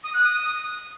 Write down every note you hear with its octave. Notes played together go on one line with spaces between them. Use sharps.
D#6
F#6
D#6